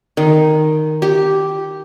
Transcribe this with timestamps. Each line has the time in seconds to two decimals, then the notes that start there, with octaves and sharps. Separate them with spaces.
0.17 D#3
1.02 G4